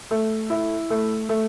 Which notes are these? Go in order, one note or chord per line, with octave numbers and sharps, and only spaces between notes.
A3
E4
A3
A3